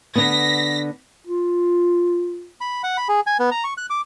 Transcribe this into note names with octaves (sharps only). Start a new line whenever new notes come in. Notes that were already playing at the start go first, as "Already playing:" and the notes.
D3 B3 A#6 B6
F4
B5
F#5
B5
G#4
G#5
B3
A#5
C#6
F#6
D6